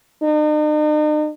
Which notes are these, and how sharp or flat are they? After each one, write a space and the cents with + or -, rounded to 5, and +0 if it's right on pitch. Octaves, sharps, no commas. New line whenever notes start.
D#4 -45